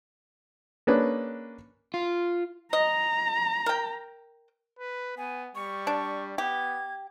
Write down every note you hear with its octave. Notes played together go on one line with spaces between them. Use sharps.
A#3 C#4 D4 G#4 B4
F4
D#5 A#5
A#4 G5
B4
B3 G#5
G3 C#6
D4
B3 G4 G#6